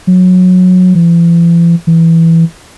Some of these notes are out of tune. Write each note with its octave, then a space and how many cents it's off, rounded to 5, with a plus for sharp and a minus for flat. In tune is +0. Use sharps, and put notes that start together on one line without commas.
F#3 -20
E3 +45
E3 +0